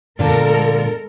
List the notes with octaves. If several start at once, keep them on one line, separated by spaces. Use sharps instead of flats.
A#2 D3 G#3 A4 A#4 A5